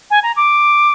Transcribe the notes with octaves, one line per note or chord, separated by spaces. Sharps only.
G#5
A#5
D6